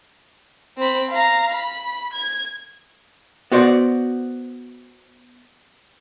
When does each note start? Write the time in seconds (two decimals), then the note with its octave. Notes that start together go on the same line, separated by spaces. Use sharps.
0.78 C4 B5
1.11 F5 A#5
1.53 B5
2.14 G#6
3.52 B3 F#4 C5 D5